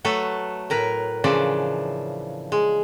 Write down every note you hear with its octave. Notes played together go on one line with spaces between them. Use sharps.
F#3 A3 A4 B4
A2 A#4 B4
C#3 E3 F3 D4 D5
G#3